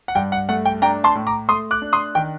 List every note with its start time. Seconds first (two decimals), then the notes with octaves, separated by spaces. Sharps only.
0.08 F#5
0.15 G2 G5
0.32 F#5
0.49 A3 F#5
0.65 G5
0.82 D4 G5 A#5
1.04 A5 C6
1.15 A2
1.27 A#5 D6
1.48 A3 C6 D#6
1.71 D6 F#6
1.82 D4
1.93 C6 D#6
2.15 D#3 G5